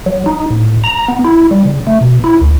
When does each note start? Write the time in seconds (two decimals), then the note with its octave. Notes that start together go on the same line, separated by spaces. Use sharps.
0.06 F#3
0.26 D#4
0.50 A2
0.84 A#5
1.08 B3
1.24 E4
1.51 G3
1.65 C#3
1.87 A3
2.01 B2
2.24 E4
2.41 D2